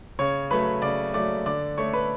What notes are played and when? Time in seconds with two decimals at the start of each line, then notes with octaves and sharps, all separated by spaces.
0.19 C#3 C#5 C#6
0.51 F#3 A3 B4 B5
0.82 C#3 D5 D6
1.14 F#3 A3 D5 D6
1.46 D3 D5 D6
1.78 A3 C#5 C#6
1.93 B4 B5